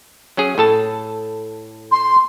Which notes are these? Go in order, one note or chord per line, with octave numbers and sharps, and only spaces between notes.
F#3 C#4 G#4
A2 A4 A5
C6